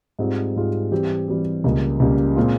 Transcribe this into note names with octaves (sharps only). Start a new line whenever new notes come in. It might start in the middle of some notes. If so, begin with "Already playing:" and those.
G#2 G3 C4 F4 G#4
G#2 G3 C4 F4 G#4
E3 G3 C4 G4
E3 G3 C4 G4
C#2 C#3 G3 A#3
C#2 C#3 G3 A#3
A#2 G#3 C4 F4